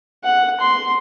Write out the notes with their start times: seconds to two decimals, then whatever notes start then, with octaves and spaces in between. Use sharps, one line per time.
0.24 F#5
0.61 C6